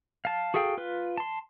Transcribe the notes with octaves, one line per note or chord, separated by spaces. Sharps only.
F5 A5
F#4 G#4 A4 F5 G5
F4 B4
A5 C6